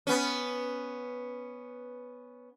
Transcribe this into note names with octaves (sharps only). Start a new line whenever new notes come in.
B3 C#4